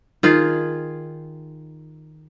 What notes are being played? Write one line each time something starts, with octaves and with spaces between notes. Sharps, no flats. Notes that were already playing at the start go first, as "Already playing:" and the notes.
D#3 F4 G#4